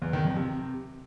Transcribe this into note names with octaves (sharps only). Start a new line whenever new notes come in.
E2
D#3
F2
C3